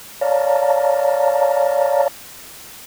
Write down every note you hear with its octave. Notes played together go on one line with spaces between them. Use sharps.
C#5 D5 F5 A5 A#5